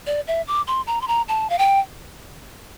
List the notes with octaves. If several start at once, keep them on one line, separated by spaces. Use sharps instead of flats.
D5
E5
D6
C6
A#5
C6
A#5
A5
F5
G5